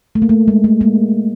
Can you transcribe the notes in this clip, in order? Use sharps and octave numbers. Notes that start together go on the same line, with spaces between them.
A3
A#3
A3
G#3
A3
G#3 A#3